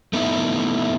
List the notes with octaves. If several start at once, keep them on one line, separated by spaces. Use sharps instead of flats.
A3 B3 D#4 E4